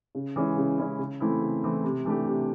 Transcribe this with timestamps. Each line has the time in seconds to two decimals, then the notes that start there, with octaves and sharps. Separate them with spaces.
0.15 C#3
0.36 E3 G#3 C#4 E4
0.57 C#3
0.78 E3 G#3 C#4 E4
0.99 C#3
1.20 E3 A3 C4 E4
1.42 C#3
1.63 E3 A3 C4 E4
1.84 C3
2.05 E3 A3 D4 G4
2.26 C3